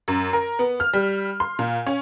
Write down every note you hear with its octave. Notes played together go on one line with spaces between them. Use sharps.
F#2
A#4
B3
F6
G3
C6
A#2
C#4